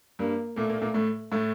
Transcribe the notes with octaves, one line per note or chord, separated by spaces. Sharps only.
G2 G3 A#3
A#2 A3 A#3
A#2 A#3
A#2 A#3
A2 A3
A2 A3